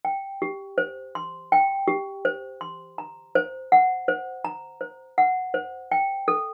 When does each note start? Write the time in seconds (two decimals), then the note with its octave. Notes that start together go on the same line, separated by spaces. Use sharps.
0.05 G5
0.42 G4
0.78 C5
1.15 C6
1.52 G5
1.88 G4
2.25 C5
2.61 C6
2.98 A#5
3.35 C5
3.72 F#5
4.08 C5
4.45 A#5
4.81 C5
5.18 F#5
5.54 C5
5.92 G5
6.28 A4